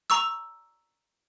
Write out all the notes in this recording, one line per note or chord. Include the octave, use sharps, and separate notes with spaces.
A#5 C#6 E6